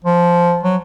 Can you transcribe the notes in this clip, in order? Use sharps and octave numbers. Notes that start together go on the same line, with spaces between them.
F3
F#3